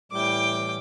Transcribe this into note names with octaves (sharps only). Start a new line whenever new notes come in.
A2 E3 G3 G5 D6